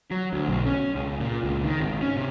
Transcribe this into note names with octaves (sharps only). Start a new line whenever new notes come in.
F#3
D2
B1
C#4
C#2
A#2
C#2
D#3
G#1
C#4
C3